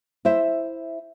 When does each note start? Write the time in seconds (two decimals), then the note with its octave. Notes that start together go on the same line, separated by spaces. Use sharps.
0.25 E4 C5 E5